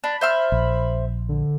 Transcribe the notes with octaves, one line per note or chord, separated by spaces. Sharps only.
D4 B5
C5 E5 F6
A#1
D3